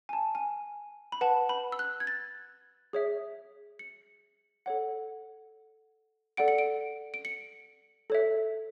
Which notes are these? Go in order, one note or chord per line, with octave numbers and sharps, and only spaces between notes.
G#5
A5
G#5
B5
B4 F#5 A5
B5
E6
F#6
G#6
A6
G#4 C#5 E5
C#7
A4 C#5 F#5
A4 D5 F#5 D7
C#7
D7
D7
C#7
A4 C#5 E5